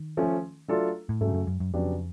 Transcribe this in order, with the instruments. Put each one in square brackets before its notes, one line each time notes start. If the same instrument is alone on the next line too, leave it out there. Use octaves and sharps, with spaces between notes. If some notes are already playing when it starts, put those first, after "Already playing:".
Already playing: [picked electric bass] D#3
[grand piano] F3 A3 C#4
F#3 A3 D4 F4 A4
[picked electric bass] A2
[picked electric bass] G#2 [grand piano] C#3 F#3 A3
[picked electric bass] G2
F#2
F#2
F#2
[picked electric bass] F2 [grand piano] C#3 F#3 B3 D4 G4